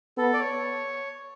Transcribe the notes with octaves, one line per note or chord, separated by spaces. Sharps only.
B3 A4
D5
C#5